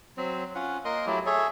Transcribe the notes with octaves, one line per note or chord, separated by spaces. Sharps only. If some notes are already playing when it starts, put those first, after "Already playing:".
F#3 C4
C#4 F4 F#5
A#3 A#4 D#5 C6
F#3 A3 E4 G4
G#4 A4 C#5 E5